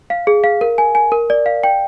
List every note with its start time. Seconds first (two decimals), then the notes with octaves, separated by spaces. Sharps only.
0.10 F5
0.27 G#4
0.44 F5
0.61 A#4
0.78 G#5
0.95 G#5
1.12 A#4
1.30 D5
1.46 F5
1.64 G5